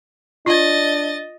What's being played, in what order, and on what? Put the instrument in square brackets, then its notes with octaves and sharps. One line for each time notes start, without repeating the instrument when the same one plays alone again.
[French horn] D4 [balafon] F4 [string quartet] D#5 A6